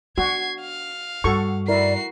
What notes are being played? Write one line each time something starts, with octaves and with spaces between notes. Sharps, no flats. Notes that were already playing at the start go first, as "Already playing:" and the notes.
D4 F#4 G#6 C7
F5
G2 F#4 A4 C#6
E4 F#4 A#4 D5 C7